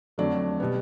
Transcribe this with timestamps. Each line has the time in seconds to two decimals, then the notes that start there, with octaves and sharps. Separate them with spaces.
0.18 F2 D3 F#3 A3 D5
0.60 B2 G3 B3